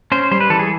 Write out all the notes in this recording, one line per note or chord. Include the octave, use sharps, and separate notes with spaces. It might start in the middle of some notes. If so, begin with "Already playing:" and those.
C#4 C5
G3 C5
B4
E3 A4
G#4